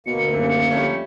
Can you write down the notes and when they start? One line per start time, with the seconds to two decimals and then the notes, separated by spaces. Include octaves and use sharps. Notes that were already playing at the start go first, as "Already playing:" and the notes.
0.07 D2 B2 A#3 C#7
0.33 D#1 F#2
0.70 F2 G3 A3 C#4